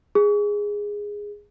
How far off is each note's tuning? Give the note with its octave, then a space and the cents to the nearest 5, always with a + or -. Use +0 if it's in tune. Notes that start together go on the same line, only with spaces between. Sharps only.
G#4 -10